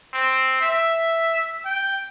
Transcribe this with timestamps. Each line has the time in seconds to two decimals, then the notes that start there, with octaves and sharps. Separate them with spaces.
0.14 C4
0.61 E5
1.65 G5